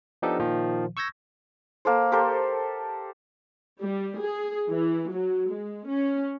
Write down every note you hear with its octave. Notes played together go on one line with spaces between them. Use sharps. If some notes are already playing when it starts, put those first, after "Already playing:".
F3 B3 D4 D#4 G4 A4
A#2 D#3 F3
C#6 E6 G6 G#6 A#6
A#3 A4 C5
G4 A4 A#4 C5
G3
G#4
E3
F#3
G#3
C#4